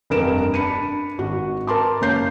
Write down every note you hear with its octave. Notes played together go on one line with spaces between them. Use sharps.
F1 G2 A#4 D7 E7
D4 B5 C#7 D#7
G#1 F#4
A#4 A5 C6 D6
F#1 A#3 C#4 G6 C7